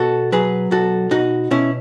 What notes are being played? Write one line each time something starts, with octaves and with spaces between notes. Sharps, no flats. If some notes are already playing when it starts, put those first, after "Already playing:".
Already playing: B2 F#4 A4
F#3 G#4 B4
B1 F#4 A4
B2 D#4 F#4
B2 C#4 E4